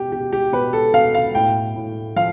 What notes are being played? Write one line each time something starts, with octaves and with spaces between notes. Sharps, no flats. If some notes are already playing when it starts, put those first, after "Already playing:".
Already playing: B2 G4
B2 G4
G4
B2 B4
A4
B2 F5
F5
A2 G5
A2
F3 F5